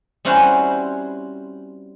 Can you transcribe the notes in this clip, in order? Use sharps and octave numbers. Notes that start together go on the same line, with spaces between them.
G3 C4 C#4 E4 F#4 C5